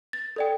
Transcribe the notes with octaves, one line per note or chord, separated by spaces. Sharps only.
A6
A4 D5 G5